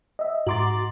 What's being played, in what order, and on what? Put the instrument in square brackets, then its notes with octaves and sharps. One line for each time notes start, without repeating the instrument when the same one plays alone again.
[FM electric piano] D#5 E5
[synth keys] G#2 A#5 C6 [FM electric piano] F#4 D6 A6